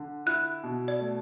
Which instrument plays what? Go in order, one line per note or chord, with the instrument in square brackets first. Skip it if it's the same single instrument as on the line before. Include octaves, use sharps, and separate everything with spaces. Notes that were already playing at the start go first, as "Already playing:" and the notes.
Already playing: [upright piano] D3
[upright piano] E4 [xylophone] F#6
[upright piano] B2
[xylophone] D5
[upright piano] A3